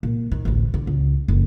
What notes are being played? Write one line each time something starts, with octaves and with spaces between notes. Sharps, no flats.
A#2
D#3
A1 D2
D3
C#2
F#1 F2